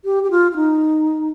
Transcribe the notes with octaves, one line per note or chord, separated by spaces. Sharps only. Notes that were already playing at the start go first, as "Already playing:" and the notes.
G4
G4
F4
F4
D#4